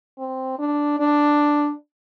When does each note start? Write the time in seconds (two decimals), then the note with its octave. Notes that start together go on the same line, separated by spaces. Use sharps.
0.18 C4
0.59 D4
0.99 D4